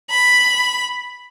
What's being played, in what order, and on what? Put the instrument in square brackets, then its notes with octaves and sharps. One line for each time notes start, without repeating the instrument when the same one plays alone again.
[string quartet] B5